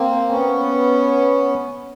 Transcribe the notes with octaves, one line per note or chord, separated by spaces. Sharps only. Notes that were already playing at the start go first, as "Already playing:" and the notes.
Already playing: A#3 C4
B3 C#4